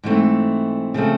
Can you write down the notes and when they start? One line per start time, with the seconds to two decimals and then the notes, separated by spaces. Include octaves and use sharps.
0.04 G#2 E3 A3 C4
0.94 C#3 F3 A3 C4